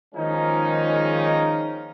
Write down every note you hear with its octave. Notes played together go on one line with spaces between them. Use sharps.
D#3 F3 G#3 A#3 C#4 D#4